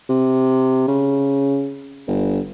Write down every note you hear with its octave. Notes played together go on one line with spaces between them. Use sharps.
C3
C#3
G1